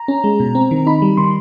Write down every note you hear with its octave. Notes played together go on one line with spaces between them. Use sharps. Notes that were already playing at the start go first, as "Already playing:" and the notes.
Already playing: A#5
C#4
G#3
B2
C4
D#3
D#4 B5
G3
D#3 C6